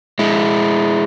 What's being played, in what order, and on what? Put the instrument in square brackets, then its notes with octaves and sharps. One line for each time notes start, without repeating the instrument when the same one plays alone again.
[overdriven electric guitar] G#3 E4